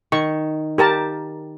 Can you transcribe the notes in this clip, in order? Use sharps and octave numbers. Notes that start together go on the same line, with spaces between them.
D#3 C#6
G4 A#4 A5